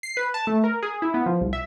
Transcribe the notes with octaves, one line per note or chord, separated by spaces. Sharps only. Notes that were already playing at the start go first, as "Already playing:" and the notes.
C7
B4
A5
A3
A#4
G#4
E4
B3
F3
C2
E5